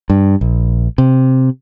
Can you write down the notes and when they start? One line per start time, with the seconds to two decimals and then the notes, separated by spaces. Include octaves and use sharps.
0.10 G2
0.41 A#1
0.98 C3